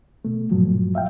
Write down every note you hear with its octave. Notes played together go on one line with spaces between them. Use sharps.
B2 A3
G2 A#2 F3 F#3
E5 F5 G5